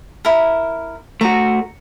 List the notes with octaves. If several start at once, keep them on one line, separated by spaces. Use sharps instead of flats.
E4 A#4
A3 F#4 A#5